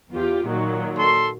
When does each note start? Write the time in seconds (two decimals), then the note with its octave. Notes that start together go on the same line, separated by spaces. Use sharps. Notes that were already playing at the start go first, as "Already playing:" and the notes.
0.11 E2 F4 G4
0.46 A#2 D#3 F#3
0.98 A4 C6